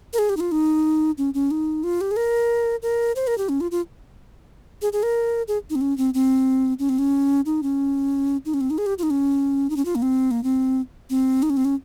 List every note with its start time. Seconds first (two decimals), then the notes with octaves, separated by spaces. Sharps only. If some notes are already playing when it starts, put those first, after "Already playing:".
0.13 A#4
0.18 G#4
0.29 G4
0.37 D#4
0.40 F4
0.52 D#4
1.18 C#4
1.34 C#4
1.51 D#4
1.84 F4
2.01 G4
2.11 G#4
2.16 A#4
2.82 A#4
3.16 C5
3.27 A#4
3.38 G4
3.49 C#4
3.61 F4
3.71 F4
4.82 G#4
4.93 G#4
5.03 A#4
5.48 G#4
5.70 D#4
5.75 C4
5.81 C#4
5.97 C4
6.14 C4
6.79 C#4
6.89 C4
6.98 C#4
7.46 D#4
7.63 C#4
8.45 D#4
8.54 C#4
8.61 C4
8.70 D#4
8.78 G#4
8.86 G4
8.98 F4
9.03 D#4
9.10 C#4
9.70 D#4
9.76 C#4
9.85 F4
9.95 A#3
10.02 C4
10.31 A#3
10.43 C4
11.10 C4
11.43 D#4
11.50 C#4
11.57 C4
11.65 C#4